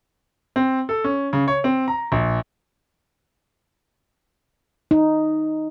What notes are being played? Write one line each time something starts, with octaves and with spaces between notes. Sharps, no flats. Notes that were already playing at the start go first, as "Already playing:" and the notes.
C4
A4
C#4
C#3
C#5
C4
A#5
A#1
D#4